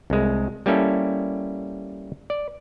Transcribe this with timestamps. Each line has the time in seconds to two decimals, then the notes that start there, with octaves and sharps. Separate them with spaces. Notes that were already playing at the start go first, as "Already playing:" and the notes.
0.10 C2 G#3
0.66 G3 A#3 C#4 E4 A4
2.30 D5